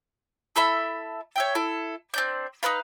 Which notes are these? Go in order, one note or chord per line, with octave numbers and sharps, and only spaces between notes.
E4 A4 E5 B5
C#5 E5 G5
E4 A4
C4 D4 G6
D#4 A#4 B4 F5